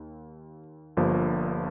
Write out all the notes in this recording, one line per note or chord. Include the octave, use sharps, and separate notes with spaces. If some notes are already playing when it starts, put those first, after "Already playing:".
Already playing: D#2
G1 G2 F3 A#3